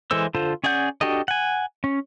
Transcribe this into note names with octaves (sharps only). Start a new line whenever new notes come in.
E3 G#3 A4 C5 E6
D3 F4 A4 C5
C#4 G#4 D5 F#5 G6
D4 F#4 G4 A4 D#5
F#5 G#5
C#4